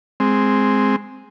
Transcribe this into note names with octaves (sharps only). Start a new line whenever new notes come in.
G#3 C4